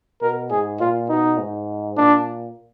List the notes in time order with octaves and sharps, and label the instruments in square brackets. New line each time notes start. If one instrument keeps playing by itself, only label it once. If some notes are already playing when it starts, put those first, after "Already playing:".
[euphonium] B2 [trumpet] A#4
[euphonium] G#2 [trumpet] G#4
[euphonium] A#2 [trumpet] F4
[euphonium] B2 [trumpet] D#4
[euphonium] G#2
[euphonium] A#2 [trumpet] D4